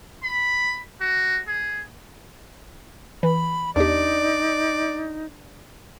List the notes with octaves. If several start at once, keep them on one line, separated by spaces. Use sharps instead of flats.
B5
F#4
G#4
E3 B5
E2 D4 D#4 G4 D5